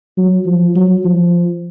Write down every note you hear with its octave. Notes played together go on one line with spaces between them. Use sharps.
F#3
F3
F#3
F3